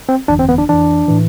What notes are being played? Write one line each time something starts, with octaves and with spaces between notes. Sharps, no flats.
C4
G1 F2 E3 D4
C4
B3
D4
F2 E3 D4
A2 E3